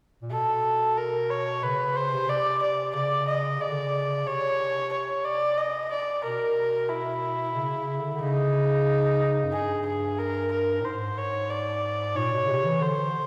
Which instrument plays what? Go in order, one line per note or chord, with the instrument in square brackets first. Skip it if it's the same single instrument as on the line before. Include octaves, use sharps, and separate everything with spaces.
[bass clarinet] A#2
[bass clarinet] B2 [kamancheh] A4
[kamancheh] A#4
C#5
[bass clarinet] C#3 [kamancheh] B4
[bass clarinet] C#3
[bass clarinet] C#3 [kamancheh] C5
[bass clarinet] C3
[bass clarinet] C3 [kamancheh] D5
[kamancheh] D5
[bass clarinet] C#3 [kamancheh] D5
[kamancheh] D#5
[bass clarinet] C#3 [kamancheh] D5
[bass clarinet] D3
C#3
[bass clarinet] C3 [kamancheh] C#5
[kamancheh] C#5
D5
D#5
D5
[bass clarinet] B2 [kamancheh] A#4
[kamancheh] E4
[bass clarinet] C#3
C#3
D3
D3
[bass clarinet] C#3 [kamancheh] D#4
[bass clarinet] F#2
[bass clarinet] G2 [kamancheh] G#4
[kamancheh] G#4
A#4
A#4
[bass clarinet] A2
[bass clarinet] G#2 [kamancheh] C5
[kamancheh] C#5
D5
[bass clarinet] A#2 [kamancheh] C#5
[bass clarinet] B2
C#3
C3
E3
[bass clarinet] D3 [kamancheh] C5